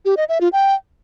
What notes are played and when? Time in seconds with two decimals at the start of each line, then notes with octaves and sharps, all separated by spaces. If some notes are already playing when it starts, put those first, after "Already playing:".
0.05 G4
0.17 D#5
0.29 E5
0.41 F4
0.53 G5